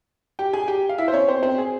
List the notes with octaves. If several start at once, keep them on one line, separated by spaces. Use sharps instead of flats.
G4 G5
G#4 G#5
G4 G5
F5
E4 E5
C5
C#4 C#5
C4 C5
C4 C5
G#4